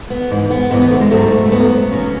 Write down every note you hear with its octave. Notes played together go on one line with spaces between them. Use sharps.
B3
G#2 E3
B3
G#2 E3 B3
B3
A3
G#3
G#2 F#3 A3
A3
G#2 F#3 B3
C#3 F#3 C#4